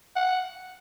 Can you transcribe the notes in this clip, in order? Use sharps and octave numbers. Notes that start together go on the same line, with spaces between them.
F#5